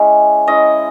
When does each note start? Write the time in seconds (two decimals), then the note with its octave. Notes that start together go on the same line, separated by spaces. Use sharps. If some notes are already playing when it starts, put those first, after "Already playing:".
Already playing: G#3 C#4 E4
0.47 G#3 C#4 E4 D#5